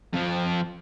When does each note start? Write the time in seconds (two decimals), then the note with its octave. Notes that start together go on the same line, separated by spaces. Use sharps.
0.13 F2 F3